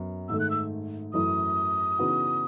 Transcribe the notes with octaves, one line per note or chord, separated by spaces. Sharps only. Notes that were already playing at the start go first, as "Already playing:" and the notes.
Already playing: F#2 B3
G#2 D#3 A3 E6
F#6
E6
F#2 E3 A3 E4 D#6
C#3 E3 B3 D#4 F#4